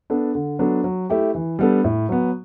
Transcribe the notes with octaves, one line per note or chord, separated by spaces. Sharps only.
B3 D4 A4
D3
F#3 B3 D4 A4
F#3
A3 E4 G4
E3
G3 B3 D4 A4
A2
F#3 B3